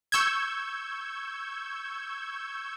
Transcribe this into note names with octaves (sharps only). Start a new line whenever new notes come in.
C#6 E6 G6 G#6